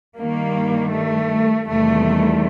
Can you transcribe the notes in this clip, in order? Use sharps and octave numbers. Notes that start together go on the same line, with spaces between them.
G2 D#3 G3 A#3
A3
E2 C3 D#3 G3 A3